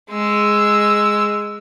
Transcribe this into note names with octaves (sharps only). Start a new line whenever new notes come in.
G#3 E6